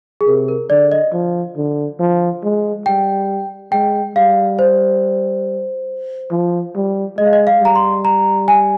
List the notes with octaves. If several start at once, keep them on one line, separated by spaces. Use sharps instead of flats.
G#4
C3 A#4
A#4
D3 D5
D#5
F3
D3
F3
G#3
G3 G5
G#3 G5
G3 F5
C5
F3
G3
G#3 D#5
F5
D#5
F5
G3 A#5
C6
A#5
G#5